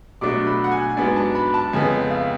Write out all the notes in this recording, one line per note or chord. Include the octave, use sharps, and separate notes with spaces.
B2 F#3 A3 D4 D6
B5
F#5
G#5
G#2 F#3 B3 D4 G#5
A5
B5
A5
F2 C#3 G#3 B3 G#5
F5